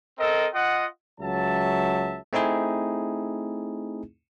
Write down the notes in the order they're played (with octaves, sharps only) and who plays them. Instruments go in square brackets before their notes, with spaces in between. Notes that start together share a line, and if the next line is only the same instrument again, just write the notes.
[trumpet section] C4 A4 A#4 D#5
F4 D#5 F#5
[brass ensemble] C#2 F#3 E5 A5
[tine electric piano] A3 C4 D#4 E4 G#4